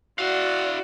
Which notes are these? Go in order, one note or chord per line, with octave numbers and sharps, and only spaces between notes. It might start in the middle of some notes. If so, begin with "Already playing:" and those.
E4 F#4 D5 F5